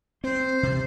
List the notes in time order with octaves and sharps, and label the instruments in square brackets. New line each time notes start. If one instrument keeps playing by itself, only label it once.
[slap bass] C4 [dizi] C5
[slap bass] C3